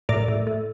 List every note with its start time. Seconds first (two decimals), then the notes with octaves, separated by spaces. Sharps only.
0.09 A2 A#4 D5
0.28 A2
0.47 A2